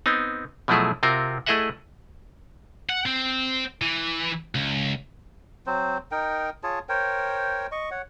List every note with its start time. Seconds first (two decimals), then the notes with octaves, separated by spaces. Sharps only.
0.06 B3 C4 D#4
0.68 B2 F3 F#3 A3 E4 G#4
1.03 C3 C4 F4 F#4 A#4
1.46 A3 E4 G#4 D#5 E5 F#5
2.89 F#5
3.06 C4
3.81 E3
4.55 C#2
5.67 F#3 C4 C5
6.12 D#4 A#4 G5
6.63 F4 G#4 C#5 A5
6.89 A#4 C5 C#5 G5
7.72 D#5 C#6
7.91 C#5 F#5